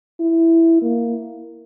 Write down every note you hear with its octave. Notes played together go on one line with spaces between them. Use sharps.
E4
A#3